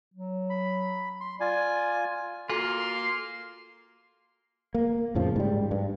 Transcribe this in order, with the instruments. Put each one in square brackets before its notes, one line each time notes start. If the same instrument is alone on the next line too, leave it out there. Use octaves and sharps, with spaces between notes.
[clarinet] F#3
[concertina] B5
C6
[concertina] F4 G#5 [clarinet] D5
[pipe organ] A#3 [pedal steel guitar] F4 [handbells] F#4 A4 G#5 [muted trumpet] C6
[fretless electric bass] A#3
F2 A2 C#3 F3
G#2 G3
G2